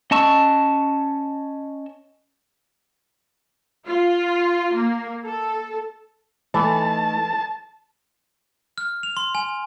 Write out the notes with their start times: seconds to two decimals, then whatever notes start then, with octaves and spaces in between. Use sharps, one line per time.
0.11 C#4 D#5 A5 C#6 E6
3.86 F4
4.74 A#3
5.25 A4
6.54 E3 A3 D#4 E4 A5
8.78 F6
9.03 F7
9.17 C6
9.35 G#5